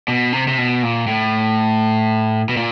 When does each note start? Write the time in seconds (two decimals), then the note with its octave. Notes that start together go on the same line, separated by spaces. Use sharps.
0.08 B2
0.33 C3
0.48 C3
0.58 B2
0.83 A#2
1.07 A2
2.49 B2
2.57 A#2